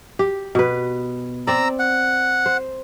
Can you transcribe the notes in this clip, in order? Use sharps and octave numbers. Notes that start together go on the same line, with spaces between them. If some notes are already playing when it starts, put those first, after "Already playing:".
G4
B2 B4
C4 D5 A#5 E6
F#5
C5